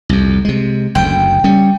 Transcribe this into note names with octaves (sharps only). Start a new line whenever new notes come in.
C2 F2
C3 G#3
F#1 D2 G5
G3 C#4